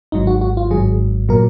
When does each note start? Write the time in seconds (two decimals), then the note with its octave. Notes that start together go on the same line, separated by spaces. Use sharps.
0.12 G#1 G#2 F#3 D#4
0.27 F#4
0.41 F#4
0.57 F4
0.71 G#1 G#2 F#3 G#4
1.29 A#2 F#3 A#4